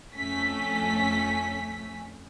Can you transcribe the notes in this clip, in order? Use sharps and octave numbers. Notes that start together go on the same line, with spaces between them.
F2 A3 C#4 B6